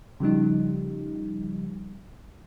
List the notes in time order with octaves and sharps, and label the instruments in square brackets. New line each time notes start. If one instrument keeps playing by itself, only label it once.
[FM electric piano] C#3 F3 G3 D#4